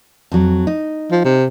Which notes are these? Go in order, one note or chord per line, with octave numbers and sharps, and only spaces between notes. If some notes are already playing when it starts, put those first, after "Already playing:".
F2 F#3
D#4
F3
C3